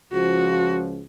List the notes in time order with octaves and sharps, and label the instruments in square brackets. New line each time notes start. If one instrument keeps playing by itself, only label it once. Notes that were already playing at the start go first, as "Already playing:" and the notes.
[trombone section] C#2 C#3 F3 [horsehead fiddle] F#4